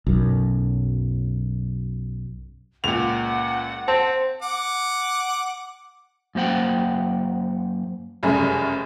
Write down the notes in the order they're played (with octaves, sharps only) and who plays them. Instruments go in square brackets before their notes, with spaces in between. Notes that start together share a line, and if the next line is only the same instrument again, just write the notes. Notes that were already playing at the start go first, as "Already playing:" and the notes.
[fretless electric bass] B1 F#2
[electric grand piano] C#2 A#2 [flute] F#5 [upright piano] F7
[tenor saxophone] C4 [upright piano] A5
[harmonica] F#5 D6
[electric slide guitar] F#2 A#3 C5 F#5 G5
[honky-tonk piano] F1 F#2 C#3 G3 A3 G#4